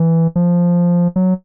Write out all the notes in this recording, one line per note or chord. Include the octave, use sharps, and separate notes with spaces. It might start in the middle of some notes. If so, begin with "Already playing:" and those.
Already playing: E3
F3
F#3